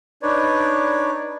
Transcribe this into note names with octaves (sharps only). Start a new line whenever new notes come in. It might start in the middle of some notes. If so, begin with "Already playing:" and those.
D4 D#4 B4 C#5 D5